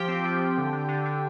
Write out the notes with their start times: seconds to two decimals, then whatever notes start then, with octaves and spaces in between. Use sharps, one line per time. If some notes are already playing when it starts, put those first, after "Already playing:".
Already playing: F3 G4 G5
0.08 C4
0.25 F3
0.41 F3
0.57 D3
0.73 D3
0.89 D3
1.05 D3